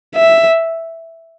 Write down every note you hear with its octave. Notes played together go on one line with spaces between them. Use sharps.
E5